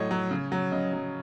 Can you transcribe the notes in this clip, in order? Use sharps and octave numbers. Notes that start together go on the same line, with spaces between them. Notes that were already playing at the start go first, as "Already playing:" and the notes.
Already playing: A2 F#3 C#5 D#5
F#3
C#3
F#3
C#3 D#5
F#3